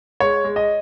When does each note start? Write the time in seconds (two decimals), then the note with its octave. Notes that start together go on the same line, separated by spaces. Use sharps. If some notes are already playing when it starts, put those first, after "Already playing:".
0.20 G#3 C#5
0.44 G#3
0.56 D#5